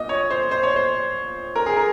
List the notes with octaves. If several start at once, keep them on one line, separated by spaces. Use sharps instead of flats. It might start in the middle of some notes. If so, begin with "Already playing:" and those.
Already playing: A#2 D#5
C#5
C5
C5
C#5
C5
A#4
G#4
A#4